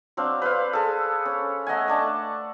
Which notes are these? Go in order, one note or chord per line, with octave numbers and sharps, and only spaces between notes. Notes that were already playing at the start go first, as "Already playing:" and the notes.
F#3 C4 D4 F5
B4 C5 F5
G#4 A4
C#4
A3 D#5 F#5 G#5
A3 D4 A5